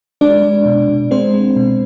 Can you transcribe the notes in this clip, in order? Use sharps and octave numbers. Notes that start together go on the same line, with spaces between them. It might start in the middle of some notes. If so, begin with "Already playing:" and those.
G#3 D4 D5
G#3
B2
B2
G#3 C4 C5
G#3
B2